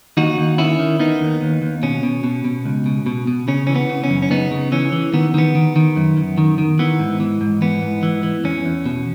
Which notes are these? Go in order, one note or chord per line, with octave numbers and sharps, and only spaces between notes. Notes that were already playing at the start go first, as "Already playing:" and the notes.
D#2 D#4 F#4
D#2
D#3 C#4 E4
D#3
D#3 B3 D#4
D#2
D#2
D#2
B2 C#4
B2
B2
B2
C#2
B2
B2
B2
C#3 C#4
E3 C#4
B3
C#3
C#4
F#2
C#4
C#3 B3 D#4
C#3
E3 C#4
E3
D#3 B3
D#3 B3
D#3
D#3
F#2
F#2
D#3
D#3
E3 B3
G#2
E3
G#2
E3 B3
G#2
E3
E3
E2 C#4
E2
B2